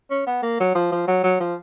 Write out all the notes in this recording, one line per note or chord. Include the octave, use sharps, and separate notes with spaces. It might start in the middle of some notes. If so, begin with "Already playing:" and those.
C#4
B3
A#3
F#3
F3
F3
F#3
F#3
F3